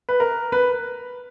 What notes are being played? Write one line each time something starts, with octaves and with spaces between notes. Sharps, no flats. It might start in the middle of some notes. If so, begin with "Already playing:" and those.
B4
A#4
B4